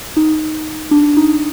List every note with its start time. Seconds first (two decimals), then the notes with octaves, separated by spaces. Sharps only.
0.17 D#4
0.91 D4
1.17 D#4